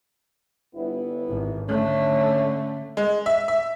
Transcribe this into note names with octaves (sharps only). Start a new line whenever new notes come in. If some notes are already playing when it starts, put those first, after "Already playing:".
G1 B3 E4
G#1
D3 A3 C#4 C#5
G#3
E5
E5